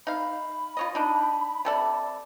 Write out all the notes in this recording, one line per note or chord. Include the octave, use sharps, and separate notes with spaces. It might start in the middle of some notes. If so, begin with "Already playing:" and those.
D#4 F5 B5
F4 C#5 D#5
D4 D#4
C3 A4 D5